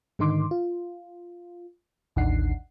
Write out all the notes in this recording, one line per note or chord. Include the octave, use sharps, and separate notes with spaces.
G#2 D3 D#3 D#4 C6 D6
F4
A1 D#2 D4 D#4 F#5 C7